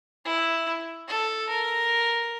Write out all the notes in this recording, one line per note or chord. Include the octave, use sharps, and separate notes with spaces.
E4
A4
A#4